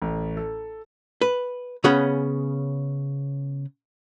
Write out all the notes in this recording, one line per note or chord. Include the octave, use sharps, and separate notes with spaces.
A1
A4
B4
C#3 B3 C#4 G#4 F#5